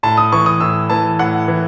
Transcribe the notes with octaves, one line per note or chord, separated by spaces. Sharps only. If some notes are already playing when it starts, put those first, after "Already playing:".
A2 A5
D#6
E3 C#6
D#6
A2 E6
E3 A5
A2 F#5
E3